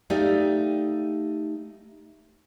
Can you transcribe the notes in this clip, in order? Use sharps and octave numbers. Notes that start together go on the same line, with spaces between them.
A3 D#4 G4 D5 F5